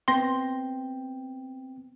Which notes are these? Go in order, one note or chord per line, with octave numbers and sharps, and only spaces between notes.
B3 C4 G5 C6 A#6